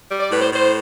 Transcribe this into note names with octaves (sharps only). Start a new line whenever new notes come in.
G3
D5
A2 B4
C5
A2 C5